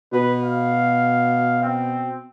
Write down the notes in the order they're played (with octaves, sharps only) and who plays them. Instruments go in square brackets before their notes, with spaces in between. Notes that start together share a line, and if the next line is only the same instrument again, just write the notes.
[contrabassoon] B2 [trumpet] B4
[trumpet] F5
C4